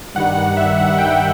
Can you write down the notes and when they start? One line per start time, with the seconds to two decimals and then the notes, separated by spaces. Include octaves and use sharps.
0.15 G2 D#3 G3 F#5
0.36 F#5
0.57 E5
0.78 F#5
0.91 F#5
0.98 G5